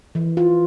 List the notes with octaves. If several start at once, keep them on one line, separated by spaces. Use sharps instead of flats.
E3
F4